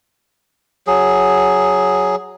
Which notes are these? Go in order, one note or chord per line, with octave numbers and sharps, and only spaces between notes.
F#3 G#4